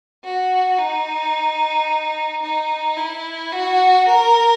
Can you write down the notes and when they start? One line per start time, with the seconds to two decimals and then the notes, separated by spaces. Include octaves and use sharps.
0.24 F#4
0.78 D#4
2.43 D#4
2.97 E4
3.52 F#4
4.06 A#4